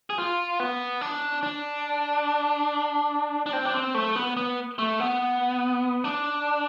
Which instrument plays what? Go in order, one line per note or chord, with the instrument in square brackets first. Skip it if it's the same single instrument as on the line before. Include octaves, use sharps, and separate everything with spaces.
[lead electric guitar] G#4
F4
B3
D4
D4
D4
C4
D4
C4
A3
B3
B3
A3
B3
D4